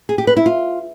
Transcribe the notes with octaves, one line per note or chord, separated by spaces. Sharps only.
G#4
G4
B4
E4
F4